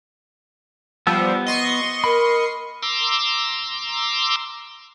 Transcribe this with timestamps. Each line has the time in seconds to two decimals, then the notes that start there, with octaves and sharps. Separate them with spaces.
1.07 F3 G3 B3 E6
1.47 D#5 C6 C#6
2.04 A#4 B5
2.83 A#5 C6 D6 E6